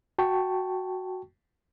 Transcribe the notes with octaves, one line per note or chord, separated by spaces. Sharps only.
F#4 G5 A5 C#6